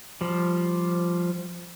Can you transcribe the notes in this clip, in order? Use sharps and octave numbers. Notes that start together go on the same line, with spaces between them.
F3 G3